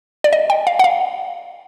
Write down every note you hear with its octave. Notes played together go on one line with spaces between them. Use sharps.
D5
D#5
G5
F5
F#5
F5